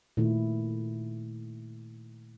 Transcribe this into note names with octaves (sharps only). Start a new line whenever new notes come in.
A#2 D#3 A3 E4